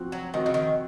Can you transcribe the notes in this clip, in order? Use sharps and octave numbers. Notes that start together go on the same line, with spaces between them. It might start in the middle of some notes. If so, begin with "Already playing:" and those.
Already playing: F3 C4 F#4
F#3
D#3 C4 F#4
C#3
D#3